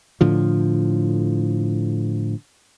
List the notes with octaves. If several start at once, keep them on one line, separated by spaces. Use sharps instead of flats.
A2 D3 F3